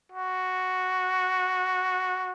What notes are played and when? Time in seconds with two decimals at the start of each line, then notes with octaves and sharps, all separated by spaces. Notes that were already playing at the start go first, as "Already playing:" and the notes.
0.12 F#4